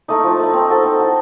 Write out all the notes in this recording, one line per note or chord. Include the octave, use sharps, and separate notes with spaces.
A3 D#4
F3
A3 D#4
C4
F#4 A4
C4
F#4 A4